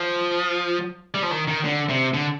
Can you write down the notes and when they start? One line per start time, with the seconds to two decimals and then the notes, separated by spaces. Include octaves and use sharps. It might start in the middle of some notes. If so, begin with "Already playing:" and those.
Already playing: F3
1.14 G3
1.23 F3
1.31 D#3
1.48 D#3
1.64 D3
1.90 C3
2.14 D3